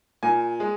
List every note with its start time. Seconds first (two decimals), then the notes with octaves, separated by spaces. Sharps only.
0.23 A#2 G#5
0.60 G#3